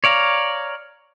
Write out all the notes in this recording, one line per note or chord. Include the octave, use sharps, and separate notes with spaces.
C#5 D5 F5 A#5